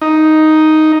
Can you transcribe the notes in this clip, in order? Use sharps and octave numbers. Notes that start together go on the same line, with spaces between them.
D#4